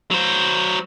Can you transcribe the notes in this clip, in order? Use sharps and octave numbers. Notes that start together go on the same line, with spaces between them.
F#3 C5